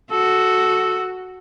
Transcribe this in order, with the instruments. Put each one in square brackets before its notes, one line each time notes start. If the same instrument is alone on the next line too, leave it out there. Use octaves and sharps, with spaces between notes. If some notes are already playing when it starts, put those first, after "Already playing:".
[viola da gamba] F#4 [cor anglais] A4